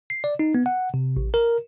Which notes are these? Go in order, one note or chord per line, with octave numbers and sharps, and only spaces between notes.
C7
D5
D#4
B3
F#5
C3
A1
A#4